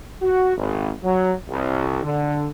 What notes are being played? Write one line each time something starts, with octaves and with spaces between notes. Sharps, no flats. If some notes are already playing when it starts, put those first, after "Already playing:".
F#4
G#1
F#3
C2
D3